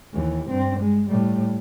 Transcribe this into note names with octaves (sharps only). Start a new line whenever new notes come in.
D#2 E3
G2 C4
G#3
A2 G3